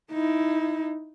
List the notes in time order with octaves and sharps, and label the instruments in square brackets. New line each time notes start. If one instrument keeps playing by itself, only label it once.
[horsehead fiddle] D#4 E4